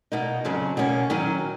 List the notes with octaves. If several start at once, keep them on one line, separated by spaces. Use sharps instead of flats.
B2 A#3 D#4
F2 C#3 F#3
B2 A#3 C#4
D#3 F#3 C#4